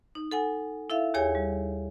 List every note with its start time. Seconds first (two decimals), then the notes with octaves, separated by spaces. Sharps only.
0.15 D#4
0.31 A4 F#5 G#5
0.90 E4 A4 E5 F5
1.14 D#2 G4 G#4 C#5 G#5
1.35 G3